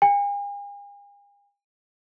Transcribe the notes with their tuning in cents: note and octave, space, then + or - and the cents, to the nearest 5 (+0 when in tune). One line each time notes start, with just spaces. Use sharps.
G#5 -45